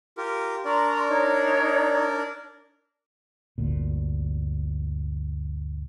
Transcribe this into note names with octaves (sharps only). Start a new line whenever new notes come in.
F4 G4 A#4
D4 A#4 D5 A#5 C6 C#6
D#4 C#5
G1 D2 A#2